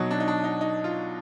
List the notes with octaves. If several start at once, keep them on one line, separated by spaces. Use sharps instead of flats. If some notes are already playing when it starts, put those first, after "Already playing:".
Already playing: B2 F#3 D#4
D4
D#4
D4
D#4
D#4
F4